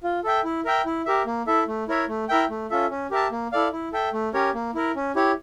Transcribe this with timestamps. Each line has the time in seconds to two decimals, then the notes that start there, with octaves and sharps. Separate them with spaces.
0.03 F4
0.24 A4 E5 G5
0.44 E4
0.65 A#4 E5 G5
0.86 E4
1.06 G4 A#4 E5
1.26 A#3
1.47 E4 A4 E5
1.68 A3
1.88 E4 A#4 C#5 E5
2.08 A3
2.29 E4 A#4 E5 G5
2.50 A3
2.70 C#4 F4 A4 E5
2.91 C#4
3.11 G4 A#4 E5 A5
3.31 A#3
3.52 E4 A4 D5 F5
3.72 E4
3.93 A4 E5 G5
4.13 A3
4.34 C#4 G4 A#4 C#5
4.54 A#3
4.75 E4 A#4
4.96 C#4
5.16 E4 G4 C#5